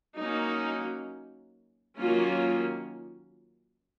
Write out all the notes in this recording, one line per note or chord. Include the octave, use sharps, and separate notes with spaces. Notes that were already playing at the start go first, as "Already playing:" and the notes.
F#3 A#3 C#4 D#4
D#3 F#3 A#3 C#4 F4